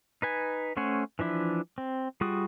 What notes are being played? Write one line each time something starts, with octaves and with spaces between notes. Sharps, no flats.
D#4 B4 G#5
A3 C#4 C5 F#5 G#5
E3 F3 D4 E4
C4
G3 F4 F#4 G#4 D#6